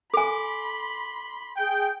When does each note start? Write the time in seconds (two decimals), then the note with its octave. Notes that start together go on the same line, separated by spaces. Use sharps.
0.14 A4 G#5 B5 C6 D6
1.57 G#4 G5